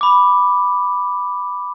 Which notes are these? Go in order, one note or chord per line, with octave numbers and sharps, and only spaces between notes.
B5 D6